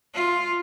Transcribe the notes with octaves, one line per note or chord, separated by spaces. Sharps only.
F4